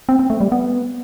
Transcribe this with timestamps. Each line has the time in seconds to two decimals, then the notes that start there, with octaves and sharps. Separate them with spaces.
0.09 C4
0.19 C4
0.30 A3
0.41 G3
0.52 B3